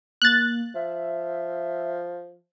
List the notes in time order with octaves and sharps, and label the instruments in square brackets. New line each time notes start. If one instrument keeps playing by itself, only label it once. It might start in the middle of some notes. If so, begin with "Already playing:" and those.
[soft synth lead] A#3 [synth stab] F#6 A6
[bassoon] F3 [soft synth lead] E5